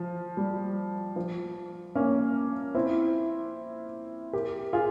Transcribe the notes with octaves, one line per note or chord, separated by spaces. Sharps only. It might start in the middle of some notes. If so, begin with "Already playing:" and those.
Already playing: F3
G3
F3
A#3 C#4
C4 E4
G4 A#4
F4 G#4